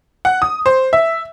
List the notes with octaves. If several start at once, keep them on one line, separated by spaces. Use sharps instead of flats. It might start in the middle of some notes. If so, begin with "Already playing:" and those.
F#5
D#6
C5
E5